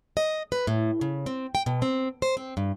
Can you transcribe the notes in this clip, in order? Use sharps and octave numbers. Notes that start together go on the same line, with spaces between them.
D#5
B4
A2
C#3
C4
G5
B2
C4
C5
C4
G2